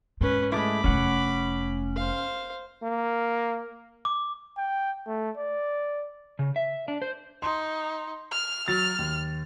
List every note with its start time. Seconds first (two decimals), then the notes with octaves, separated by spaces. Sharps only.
0.21 G#2 C#4 B4
0.52 G#3 A3 E4 B5 D6
0.84 F1 A3 C#4 F#5
1.96 C5 F5
2.82 A#3
4.05 D6
4.57 G5
5.07 A3
5.38 D5
6.39 C#3
6.56 E5
6.88 D4
7.02 C5
7.42 D#4 C6
8.31 F6
8.68 F#3 F6 A6
8.98 D#2